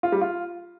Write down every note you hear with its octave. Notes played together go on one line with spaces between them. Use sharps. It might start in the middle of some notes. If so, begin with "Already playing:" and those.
F4
G3
F4